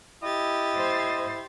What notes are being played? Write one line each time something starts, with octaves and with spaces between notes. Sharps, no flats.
E4 G4 D#5 A6
C5